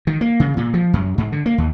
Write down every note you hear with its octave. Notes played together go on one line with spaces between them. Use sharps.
D#3
A#3
C#3
A#2
F3
F#2
G#2
D3
A#3
D#2